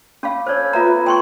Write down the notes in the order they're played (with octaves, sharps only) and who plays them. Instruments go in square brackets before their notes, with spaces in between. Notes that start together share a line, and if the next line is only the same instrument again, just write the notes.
[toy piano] C#4 F5 [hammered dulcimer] B5 C#6 D6
[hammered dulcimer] A4 G#5 [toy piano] C5 C#5
[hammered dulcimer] B3 [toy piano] F4 E5 A#5
[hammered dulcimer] A3 [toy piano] G5 C6 C#6